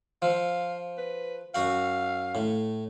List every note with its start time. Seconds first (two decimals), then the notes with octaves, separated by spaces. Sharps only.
0.22 F3 F5
0.98 B4
1.55 F#2 F#4 F5 F#5
2.35 A2